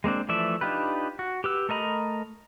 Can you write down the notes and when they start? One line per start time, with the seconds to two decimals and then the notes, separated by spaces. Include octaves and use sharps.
0.04 G#3 A#3 C4 D4
0.29 E3 F3 A3 D5 E5
0.61 D4 D#4 F4 G4 B4
1.19 F#4
1.44 G4 B4 E6
1.69 A3 A#4 D#5 A#5 B5